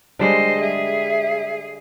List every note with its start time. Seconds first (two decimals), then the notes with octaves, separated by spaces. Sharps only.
0.19 D3 G3 G#3 C5 D#5
0.60 G#4 E5